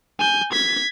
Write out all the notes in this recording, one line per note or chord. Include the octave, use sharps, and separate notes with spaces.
G#5 G6
G#6 B6